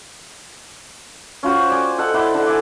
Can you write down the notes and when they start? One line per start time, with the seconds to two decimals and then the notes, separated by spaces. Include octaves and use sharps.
1.43 C#4 F4 F#4 C5
1.70 D5 G5 G#5
1.98 A4 D#5 F#5
2.14 E4 D5 F#5 C6
2.34 D3
2.47 D5 E5 G#5